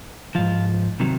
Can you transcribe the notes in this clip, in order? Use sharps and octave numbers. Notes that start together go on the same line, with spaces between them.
G#2 F3 F4
C3 D#3 F#3